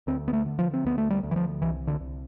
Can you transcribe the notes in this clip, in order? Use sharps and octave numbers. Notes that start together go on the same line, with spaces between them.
D2 C4
B3
A3
D3
F3
C4
D2 B3
A3
G3
D2
E3
F3
C2 E3
D3
C2